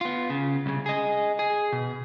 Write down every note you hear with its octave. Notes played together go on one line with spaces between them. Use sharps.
B3 F4
C#3
C2 C#3
G#4 D#5
G#4
B2